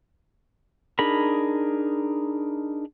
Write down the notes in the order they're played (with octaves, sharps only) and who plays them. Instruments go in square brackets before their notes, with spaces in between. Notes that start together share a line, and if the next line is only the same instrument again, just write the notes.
[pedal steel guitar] D4 D#4 G#4 A#4 B5